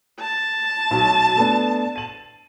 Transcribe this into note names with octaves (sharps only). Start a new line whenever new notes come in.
A5
B1 B2 F#3
A3 B3 D4
D#7 F#7